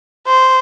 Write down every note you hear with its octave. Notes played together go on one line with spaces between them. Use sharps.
C5